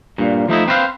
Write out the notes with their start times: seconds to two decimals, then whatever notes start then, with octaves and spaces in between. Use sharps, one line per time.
0.18 G2 A#2
0.48 F3 A3 D#4 E4
0.68 C4 B4 C5 D#5 F5